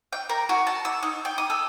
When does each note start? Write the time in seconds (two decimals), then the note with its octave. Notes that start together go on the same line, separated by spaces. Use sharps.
0.13 G5
0.29 A#4
0.49 F#4
0.67 A5
0.85 E6
1.03 D#4
1.25 G5
1.38 D#6
1.50 A4